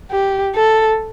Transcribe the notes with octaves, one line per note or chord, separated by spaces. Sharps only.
G4
A4